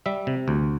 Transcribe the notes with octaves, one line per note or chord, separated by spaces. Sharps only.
G3 E5
C3
D2